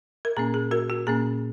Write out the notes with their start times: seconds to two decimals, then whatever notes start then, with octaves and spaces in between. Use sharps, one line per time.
0.25 A#4
0.37 A#2 A#3 C#4 G#4
0.54 G#4
0.71 F#4 A#4
0.90 F#4
1.07 A#2 A#3 C#4 G#4